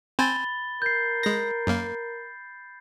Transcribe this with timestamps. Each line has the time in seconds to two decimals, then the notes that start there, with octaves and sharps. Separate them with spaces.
0.19 C4 C5 G#5 B5 A6 G7
0.82 A#4 G6 C7
1.23 G#3 A#6
1.67 F#2 A#3